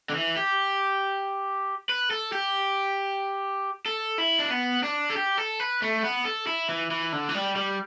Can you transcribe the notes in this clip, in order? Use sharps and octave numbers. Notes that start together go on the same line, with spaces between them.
D3
E3
G4
B4
A4
G4
A4
E4
D4
B3
D4
A4
G4
A4
B4
A3
B3
A4
E4
E3
E3
D3
E3
G3
G3